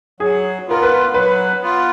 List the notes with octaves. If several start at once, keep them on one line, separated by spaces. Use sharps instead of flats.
F#3 G#4
B3 F4 A#4
B4
F#3 B4
B3 F4